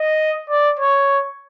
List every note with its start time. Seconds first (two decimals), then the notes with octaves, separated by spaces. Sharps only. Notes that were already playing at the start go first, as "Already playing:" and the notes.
Already playing: D#5
0.50 D5
0.79 C#5